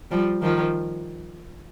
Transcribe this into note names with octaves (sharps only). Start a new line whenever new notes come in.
F3 G3
D#3 F3